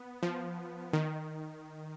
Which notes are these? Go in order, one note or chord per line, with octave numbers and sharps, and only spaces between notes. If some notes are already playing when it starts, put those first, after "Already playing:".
Already playing: B3
F3
D#3